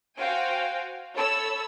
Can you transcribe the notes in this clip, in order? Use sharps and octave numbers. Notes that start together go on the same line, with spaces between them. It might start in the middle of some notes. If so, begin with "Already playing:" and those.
F#4 C5 F5 G5 G#5
A4 C#5 B5 E6